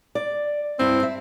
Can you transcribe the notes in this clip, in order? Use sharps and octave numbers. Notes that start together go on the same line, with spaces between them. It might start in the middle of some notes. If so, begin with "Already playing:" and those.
D5
G2 C4 E4
E5